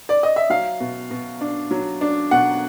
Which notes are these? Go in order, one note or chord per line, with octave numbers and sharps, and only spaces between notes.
D5
D#5
E5
F#3 F5
B2
B2
D4
F#3
D4
B2 F#5